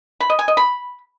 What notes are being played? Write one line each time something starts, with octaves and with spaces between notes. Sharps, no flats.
B5
D#5
G#5
D#5
B5